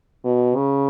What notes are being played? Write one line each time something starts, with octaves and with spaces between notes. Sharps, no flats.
B2
C#3